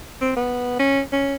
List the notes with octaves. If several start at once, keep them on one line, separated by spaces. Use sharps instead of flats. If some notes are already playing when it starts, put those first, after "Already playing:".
C4
B3
C#4
C#4